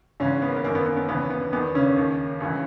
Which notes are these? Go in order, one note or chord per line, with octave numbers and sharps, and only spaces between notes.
G#2 C#3 E3 C#4
B3
A#3
B3
F#2 D#3 A#3
B3
B3
B3
D#2 C#3 E3 B3
B3
E2 D#3 B3
C#3 C#4
D#2 D#3
C#2 C#3 E3